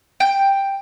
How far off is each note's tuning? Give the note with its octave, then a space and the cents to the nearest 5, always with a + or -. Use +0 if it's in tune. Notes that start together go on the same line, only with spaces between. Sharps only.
G5 +5